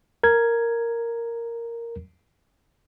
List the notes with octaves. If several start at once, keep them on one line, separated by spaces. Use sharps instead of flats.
A#4 G#6